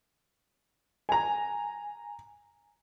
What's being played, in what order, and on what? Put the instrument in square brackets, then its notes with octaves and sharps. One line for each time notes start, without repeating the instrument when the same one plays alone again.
[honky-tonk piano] G#5 A#5